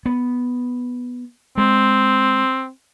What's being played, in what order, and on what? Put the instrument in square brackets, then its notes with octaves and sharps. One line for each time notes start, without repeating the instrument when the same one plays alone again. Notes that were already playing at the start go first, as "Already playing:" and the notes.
[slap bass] B3
[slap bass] G#3 [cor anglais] C4